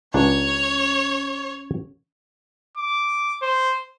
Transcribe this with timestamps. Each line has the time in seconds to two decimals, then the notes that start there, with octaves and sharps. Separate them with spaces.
0.14 C#2 C#4 D4 C#5
2.77 D6
3.42 C5